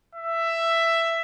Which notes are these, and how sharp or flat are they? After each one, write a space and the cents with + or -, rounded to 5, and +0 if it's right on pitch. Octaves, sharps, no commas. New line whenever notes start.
E5 +10